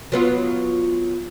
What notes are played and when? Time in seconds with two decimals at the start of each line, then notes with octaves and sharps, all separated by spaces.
0.12 F#3 B3 F4